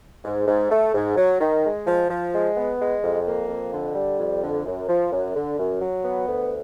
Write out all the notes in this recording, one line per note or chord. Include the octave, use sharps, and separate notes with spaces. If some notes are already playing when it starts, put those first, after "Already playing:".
G#2
G#2
A3
G#2
F#3
D#3
G#3
F3
F3
G#3
B3
G#3
F2
A#3
F2
D3
G3
F2
D3
F#2
F3
F#2
D3
F#2
F#3
B3
D2